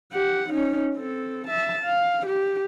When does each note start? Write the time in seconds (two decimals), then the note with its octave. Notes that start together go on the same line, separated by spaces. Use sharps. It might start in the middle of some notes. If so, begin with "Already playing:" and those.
0.13 G4 F#5
0.50 C#4 D#4
0.95 C4 A4
1.47 E5 A5
1.84 F5
2.26 G4